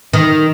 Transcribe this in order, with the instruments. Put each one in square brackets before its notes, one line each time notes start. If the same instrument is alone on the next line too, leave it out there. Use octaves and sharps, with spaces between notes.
[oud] D#3